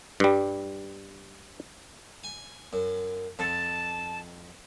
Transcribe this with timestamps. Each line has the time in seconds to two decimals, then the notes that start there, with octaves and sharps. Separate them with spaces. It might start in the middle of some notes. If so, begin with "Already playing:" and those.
0.20 G2 G3
2.24 G#5
2.73 F#2
3.39 F2 A5